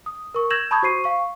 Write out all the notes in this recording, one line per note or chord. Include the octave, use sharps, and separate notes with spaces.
D#6
A#4 C#6
E6 G6 G#6 A#6 E7 F#7
A5 B5 C#6 D#6 G6 G#6
F#4 C5 C#6 C7 D#7
F5 C#6